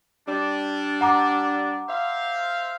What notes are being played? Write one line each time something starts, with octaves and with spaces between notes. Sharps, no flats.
G3 D4
F#5 A#5 D6
C5 E5 F5